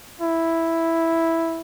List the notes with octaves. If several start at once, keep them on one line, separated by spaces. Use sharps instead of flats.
E4